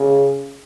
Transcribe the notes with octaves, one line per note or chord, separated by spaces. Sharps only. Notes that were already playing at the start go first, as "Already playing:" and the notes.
Already playing: C#3